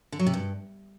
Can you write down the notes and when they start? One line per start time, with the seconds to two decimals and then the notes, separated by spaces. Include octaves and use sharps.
0.12 D3
0.19 F#3
0.26 C3
0.34 G2